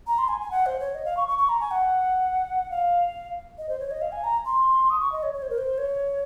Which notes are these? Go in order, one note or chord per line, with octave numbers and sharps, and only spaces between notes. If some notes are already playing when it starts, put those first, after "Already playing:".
A#5
C6
G#5
G#5
F#5
C5
C#5
D#5
F5
C#6
C#6
C#6
A#5
G#5
F#5
F5
D#5
C5
C#5
D#5
F5
G#5
A#5
C6
D#6
C#6
D#5
C#5
C#5
C5
A#4
C5
C#5